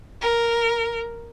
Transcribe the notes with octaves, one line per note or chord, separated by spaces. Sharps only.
A#4